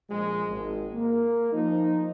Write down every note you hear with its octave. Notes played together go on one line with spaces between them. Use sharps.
A#1 F3 G#3
G#1
A#3
F3 D#4